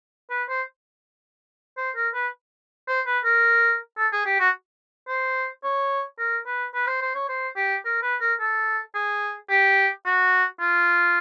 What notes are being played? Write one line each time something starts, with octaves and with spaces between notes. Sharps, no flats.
B4
C5
C5
A#4
B4
C5
B4
A#4
A4
G#4
G4
F#4
C5
C#5
A#4
B4
B4
C5
C5
C#5
C5
G4
A#4
B4
A#4
A4
G#4
G4
F#4
F4